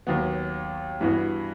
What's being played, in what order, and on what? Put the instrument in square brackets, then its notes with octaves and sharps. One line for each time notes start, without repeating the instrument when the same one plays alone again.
[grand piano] D#2 D#3 F#3 B3
G2 E3 B3 F#4